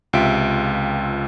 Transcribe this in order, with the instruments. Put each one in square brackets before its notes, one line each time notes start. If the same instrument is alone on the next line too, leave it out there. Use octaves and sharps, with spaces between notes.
[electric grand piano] C#2 C3 F4 E5 D7